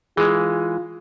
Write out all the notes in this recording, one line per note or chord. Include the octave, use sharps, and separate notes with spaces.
E3 G#3 F4 G#4